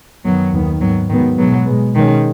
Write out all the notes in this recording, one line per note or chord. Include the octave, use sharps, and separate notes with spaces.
F#2 D#3 F#3 B3
D#2 D#3 B3
G#2 D#3 F#3 B3
G#2 D#3 F#3 B3
B2 F#3 G#3 B3
B2 G#3 B3
B2 D#3 G#3 C#4